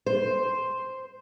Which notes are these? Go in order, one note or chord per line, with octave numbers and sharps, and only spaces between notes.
C5